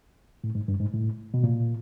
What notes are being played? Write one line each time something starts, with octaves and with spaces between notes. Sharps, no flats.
A2
G#2
G2
G#2
A2
B2
A#2